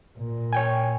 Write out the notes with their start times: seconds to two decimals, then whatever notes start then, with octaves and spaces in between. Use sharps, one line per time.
0.19 A#2
0.53 C#5 G5 G#5